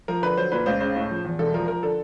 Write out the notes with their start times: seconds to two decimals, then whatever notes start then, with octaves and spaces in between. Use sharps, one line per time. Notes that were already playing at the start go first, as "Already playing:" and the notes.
0.08 F3 A#4
0.22 D3 B4
0.37 F#3 C5
0.52 A#2 B4
0.66 C#2 C5
0.81 C#3 C5
0.96 A2
1.11 F3
1.25 E2
1.39 E1 A4
1.54 F3 A#4
1.68 F3 A#4
1.83 D3 A4